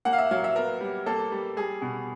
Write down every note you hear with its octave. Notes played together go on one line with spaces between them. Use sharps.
A#3 F#5
F5
E5
F#3 F5
E5
B3 A#4
G3
A#3 A4
G3
G3 G#4
B2